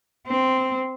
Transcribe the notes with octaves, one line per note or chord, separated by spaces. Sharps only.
C4